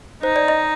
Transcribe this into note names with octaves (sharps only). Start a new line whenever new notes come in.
D#4 C5
D5
D#5